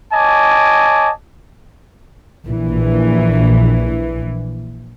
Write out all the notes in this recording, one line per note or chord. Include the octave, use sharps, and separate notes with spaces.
C#5 D#5 G#5 A5 D6
A#1 E3